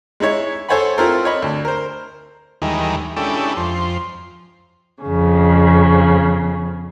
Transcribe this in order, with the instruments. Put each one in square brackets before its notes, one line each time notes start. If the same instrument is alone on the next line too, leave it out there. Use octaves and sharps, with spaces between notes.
[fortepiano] G#3 D#4 E4 C#5
A4 C5 C#5 F#5 G#5 B5
C4 E4 F4 A4 A#4 C5
C#5 D#5 B5
D2
A#4 C5
[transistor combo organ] D#2 D#3 E3 G3 G#3
G#3 C#4 D4 E4 G4 A4
F2 C5
[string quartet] F2 C#3